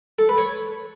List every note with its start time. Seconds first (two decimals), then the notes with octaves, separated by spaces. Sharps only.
0.19 A4
0.29 B4
0.38 C#5